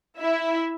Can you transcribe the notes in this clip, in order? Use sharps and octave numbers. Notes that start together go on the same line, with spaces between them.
E4 E5